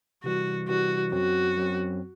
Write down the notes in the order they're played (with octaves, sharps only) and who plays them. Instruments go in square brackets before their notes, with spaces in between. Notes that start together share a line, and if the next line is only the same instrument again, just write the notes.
[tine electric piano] C3 E3 G3 [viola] F#4
[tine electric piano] C3 E3 G3 [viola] F#4
[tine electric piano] F#2 F#3 C4 [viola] F#4
[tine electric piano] F#2 F#3 C4